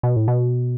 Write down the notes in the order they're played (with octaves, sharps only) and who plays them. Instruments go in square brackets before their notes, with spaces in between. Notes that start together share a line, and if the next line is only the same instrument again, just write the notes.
[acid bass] B2
A2
B2